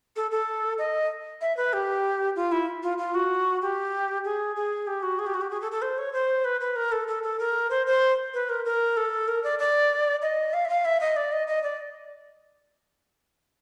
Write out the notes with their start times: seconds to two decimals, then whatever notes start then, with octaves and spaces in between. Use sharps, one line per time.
0.16 A4
0.31 A4
0.78 D#5
1.41 E5
1.57 B4
1.73 G4
2.36 F4
2.52 E4
2.83 F4
2.98 F4
3.15 F#4
3.62 G4
4.24 G#4
4.56 G#4
4.87 G4
5.03 F#4
5.19 G#4
5.26 G4
5.34 F#4
5.41 G4
5.51 G#4
5.61 A4
5.72 A4
5.82 C5
5.98 C#5
6.13 C5
6.45 B4
6.61 B4
6.76 A#4
6.92 A4
7.08 A4
7.23 A4
7.39 A#4
7.70 C5
7.87 C5
8.34 B4
8.49 A#4
8.65 A#4
8.97 A4
9.28 A#4
9.44 D5
9.59 D5
10.22 D#5
10.53 F5
10.65 E5
10.69 F5
10.85 E5
11.01 D#5
11.16 D5
11.32 D#5
11.48 D#5
11.63 D5